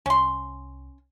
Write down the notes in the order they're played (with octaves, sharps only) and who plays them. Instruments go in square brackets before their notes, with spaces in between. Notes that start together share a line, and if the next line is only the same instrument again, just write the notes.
[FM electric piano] C2 [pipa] C#4 C6